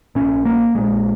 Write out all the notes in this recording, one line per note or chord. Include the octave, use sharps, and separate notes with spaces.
A#1 A#2 C#4
A#3
A#1 A#2 G#3